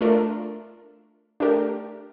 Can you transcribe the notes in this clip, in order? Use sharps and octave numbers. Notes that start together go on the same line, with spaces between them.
A3 D4 F4 A#4
A3 D4 G4 A#4